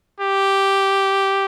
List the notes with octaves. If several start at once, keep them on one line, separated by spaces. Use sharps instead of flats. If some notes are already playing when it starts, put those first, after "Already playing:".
G4